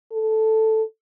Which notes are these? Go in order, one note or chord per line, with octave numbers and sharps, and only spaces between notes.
A4